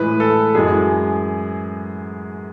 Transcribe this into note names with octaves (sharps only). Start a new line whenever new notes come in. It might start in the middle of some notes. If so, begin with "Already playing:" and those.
Already playing: A2 E3 G#3 B4
A4
F#2 E3 G#3 G#4